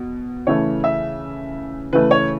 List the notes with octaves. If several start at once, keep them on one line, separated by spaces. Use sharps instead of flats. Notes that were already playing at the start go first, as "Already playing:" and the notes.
Already playing: B2
C#3 E3 A3 C#5
E5
C#3 E3 A3 B4
C#5